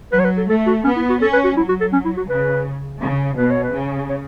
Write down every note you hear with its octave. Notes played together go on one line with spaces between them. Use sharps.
F#3 B4
C#5
B4
A4
A3 A4
F#4
B3 C#4
E4
F#4
C#4 A4
B4
F#4
F#3 E4
F#4
A4
C#4
E4
F#4
C#3 B4
C#3
B2 B4
C#5
B4
C#3
C#5